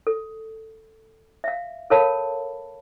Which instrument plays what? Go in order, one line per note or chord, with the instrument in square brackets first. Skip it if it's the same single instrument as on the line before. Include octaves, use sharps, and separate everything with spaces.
[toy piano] A4
E5 F5
A4 A#4 C#5 F5 A5 B5